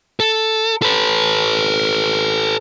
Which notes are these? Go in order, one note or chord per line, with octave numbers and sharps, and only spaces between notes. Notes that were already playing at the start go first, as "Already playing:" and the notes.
A4
A4 B4